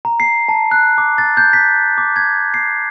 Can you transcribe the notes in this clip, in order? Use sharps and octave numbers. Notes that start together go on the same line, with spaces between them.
A#5
C7
A5
F#6
D6
A6
G6
B6
D6
G#6
C7